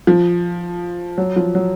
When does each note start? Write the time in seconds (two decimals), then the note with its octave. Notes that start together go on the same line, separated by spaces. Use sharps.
0.07 F3
1.18 F#3
1.36 F3
1.55 F#3